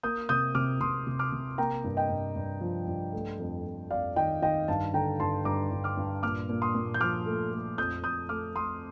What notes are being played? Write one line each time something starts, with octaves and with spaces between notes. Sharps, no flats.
A#3 D#6 G6
C3 D#6 G6
C3 D6 F6
C3 C6 D#6
C3
D6 F6
C3
A#3 G5 A#5
G2
D#5 G5
G2
G2
F3
G2
A3
F2
F2
F2 D5 F5
D#3 D#5 G5
D#3 D#5 G5
G2 F5 A5
D3 G5 A#5
G2 A5 C6
G2 A#5 D6
G2
D6 F6
G2
A#2 D6 F6
A#2
C6 D#6
A#2
G6
F3 D6 F6
A3
A3
F2 D#6 G6
F2 D#6 G6
A3 D6 F6
A3 C6 D#6